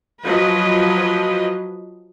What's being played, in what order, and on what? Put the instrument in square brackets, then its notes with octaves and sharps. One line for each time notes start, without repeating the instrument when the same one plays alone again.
[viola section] F3 F#3 B4 D#5